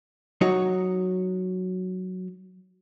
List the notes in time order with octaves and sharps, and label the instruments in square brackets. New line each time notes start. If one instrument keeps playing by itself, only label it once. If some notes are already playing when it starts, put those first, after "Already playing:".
[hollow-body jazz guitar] F#3 D#4 F#4 C#5